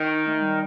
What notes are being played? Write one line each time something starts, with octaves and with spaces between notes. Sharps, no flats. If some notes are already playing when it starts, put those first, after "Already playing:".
Already playing: D#3
D#4
A3
G3